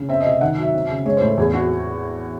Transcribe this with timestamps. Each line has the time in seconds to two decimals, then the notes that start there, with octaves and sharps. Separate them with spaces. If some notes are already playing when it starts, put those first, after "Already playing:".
Already playing: C#3
0.09 C4 E5
0.20 D#5
0.26 C3
0.31 E5
0.41 D#3 F#5
0.58 F#3 E5
0.74 C4
0.89 C#3
1.06 G#3 C#5
1.17 A2 C5
1.27 A4
1.37 E2 G#4
1.53 C4 F#4